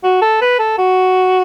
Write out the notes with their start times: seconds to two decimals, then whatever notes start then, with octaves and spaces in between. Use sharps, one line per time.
0.04 F#4
0.21 A4
0.41 B4
0.59 A4
0.78 F#4